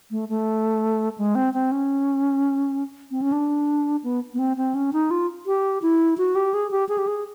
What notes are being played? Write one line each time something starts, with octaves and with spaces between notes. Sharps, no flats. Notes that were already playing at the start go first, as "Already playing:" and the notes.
A3
A3
G#3
C4
C4
C#4
C4
C#4
D4
B3
B3
C4
C4
C#4
D#4
F4
G4
E4
F#4
G4
G#4
G4
G#4
G4
G#4